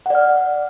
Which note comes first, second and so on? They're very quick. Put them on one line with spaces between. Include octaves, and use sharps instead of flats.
F#5 D5 F6